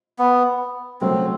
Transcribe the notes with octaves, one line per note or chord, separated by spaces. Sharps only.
B3
C#3 F#3 A3 C4